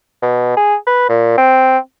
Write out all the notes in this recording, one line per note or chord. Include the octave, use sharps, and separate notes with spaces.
B2
G#4
B4
A#2
C4